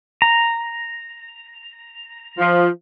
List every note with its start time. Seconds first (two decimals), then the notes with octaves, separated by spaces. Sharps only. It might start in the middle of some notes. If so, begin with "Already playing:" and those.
0.22 A#5
2.38 F3